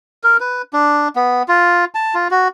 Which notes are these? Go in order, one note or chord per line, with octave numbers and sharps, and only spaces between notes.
A#4
B4
D4
B3
F4
A5
F4
F#4